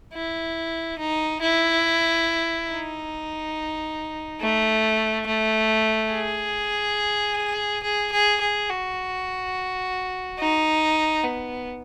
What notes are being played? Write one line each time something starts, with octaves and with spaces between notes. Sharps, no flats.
E4
D#4
E4
D#4
A3
A3
G#4
G#4
G#4
G#4
F#4
D#4
B3